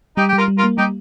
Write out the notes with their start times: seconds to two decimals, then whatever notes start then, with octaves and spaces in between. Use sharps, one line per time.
0.17 G3 D#4 G4
0.29 G3 G4
0.38 F4 A#4
0.48 G3
0.58 F4 A#4
0.64 A#3
0.78 G3 D#4 G4